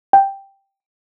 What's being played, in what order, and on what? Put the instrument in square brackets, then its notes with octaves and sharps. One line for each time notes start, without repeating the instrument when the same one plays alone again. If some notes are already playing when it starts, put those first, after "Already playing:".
[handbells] G5